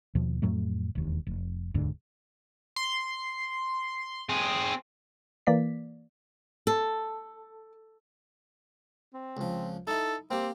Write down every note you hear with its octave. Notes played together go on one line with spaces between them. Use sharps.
D#2 B2 F3
F2 A2 F#3 A3
E1 D#2
F1
E1 D2 G#2 D3
C6
C4 G#4
E3 A#3 D5 B6
A4
C4
C#2 F3
D#4 E4 A4
A#3 C4 G4